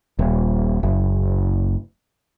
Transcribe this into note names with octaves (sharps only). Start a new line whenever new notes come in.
D#1
F#1